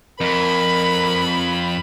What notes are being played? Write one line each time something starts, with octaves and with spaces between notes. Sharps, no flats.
F2 A#4 B5